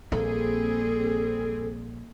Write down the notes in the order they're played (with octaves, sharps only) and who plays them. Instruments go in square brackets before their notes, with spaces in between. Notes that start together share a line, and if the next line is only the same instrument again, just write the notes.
[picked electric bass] A#1 [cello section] G3 C4 G#4 [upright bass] A#3 [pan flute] A4